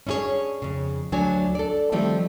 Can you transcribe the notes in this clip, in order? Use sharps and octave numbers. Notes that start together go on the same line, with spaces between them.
C#4 D4 E4 G#4 C#5
F2 C#3
D2 F#3 D4 C#5 G#5
A4 D5
D#3 F3 G3 A3 C4